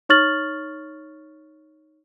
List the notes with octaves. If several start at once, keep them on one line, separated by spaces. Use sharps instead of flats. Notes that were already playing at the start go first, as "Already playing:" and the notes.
D#4 C#5 C#6 F6 A6 F#7